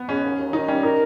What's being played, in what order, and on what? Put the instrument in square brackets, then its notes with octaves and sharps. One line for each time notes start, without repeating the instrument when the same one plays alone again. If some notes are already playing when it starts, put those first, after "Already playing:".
Already playing: [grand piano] B3
[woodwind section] G#3 [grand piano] C#4
[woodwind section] D#2
D#2
[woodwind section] D#3 [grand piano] D#4
[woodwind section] G3 [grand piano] C#4
[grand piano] D#4 [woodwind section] A#4